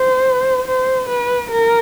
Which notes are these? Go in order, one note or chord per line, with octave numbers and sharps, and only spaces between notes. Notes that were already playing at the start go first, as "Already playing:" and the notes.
Already playing: C5
C5
B4
A#4